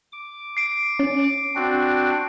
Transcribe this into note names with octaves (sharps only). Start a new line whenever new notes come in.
D6
C7 D7
C#4
C4 D4 F#4